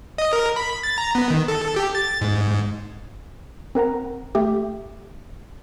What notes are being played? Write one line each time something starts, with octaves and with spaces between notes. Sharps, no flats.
D#5
A#4
B5
A6
A#5
B3
D#3
A4
G4
A6
G#2
C4 A#4 F#5 A#5
A3 G4